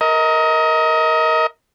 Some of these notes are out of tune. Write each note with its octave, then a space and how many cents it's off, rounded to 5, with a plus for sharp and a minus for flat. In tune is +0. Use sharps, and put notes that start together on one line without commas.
A#4 +0 D#5 +30